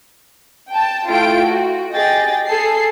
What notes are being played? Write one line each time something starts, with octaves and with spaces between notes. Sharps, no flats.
G5 A5
A3 E4 F4 G5 D7
F#4
G4 G#4 D#5 G5 A6
G#4 A4 C7